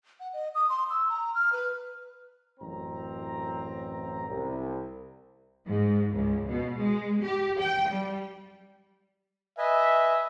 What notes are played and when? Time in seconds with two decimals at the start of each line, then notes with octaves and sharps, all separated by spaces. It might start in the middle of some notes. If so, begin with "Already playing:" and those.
0.20 F#5
0.33 D#5
0.55 D#6
0.69 C6
0.90 E6
1.09 A#5
1.35 F6
1.53 B4
2.60 A1 F#2 C4 A#5
4.29 C2
5.67 G#2
6.14 C#2
6.48 B2
6.80 G#3
7.23 G4
7.60 G5
7.91 G3
9.58 B4 D#5 E5 G#5